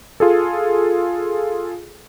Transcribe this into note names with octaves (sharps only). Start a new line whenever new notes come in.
F4 G#4 A4